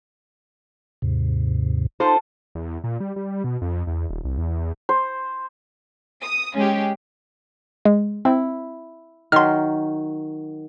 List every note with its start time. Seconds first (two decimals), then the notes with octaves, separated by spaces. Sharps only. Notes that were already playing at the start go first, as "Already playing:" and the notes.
1.02 D#2 G#2 C3
2.00 D#4 F4 A4 C5
2.55 E2
2.84 A#2
3.00 G3
3.16 G3
3.44 B2
3.62 F2
3.87 E2
4.10 D#1
4.24 C2
4.38 E2
4.89 C5
6.22 D#6
6.55 G#3 C#4 G4
7.85 G#3
8.25 C4 E4
9.32 D#3 F#3 C6 F6